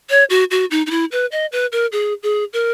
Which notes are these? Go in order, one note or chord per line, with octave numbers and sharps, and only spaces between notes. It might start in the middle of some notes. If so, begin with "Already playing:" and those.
C#5
F#4
F#4
D#4
D#4
E4
B4
D#5
B4
A#4
G#4
G#4
A#4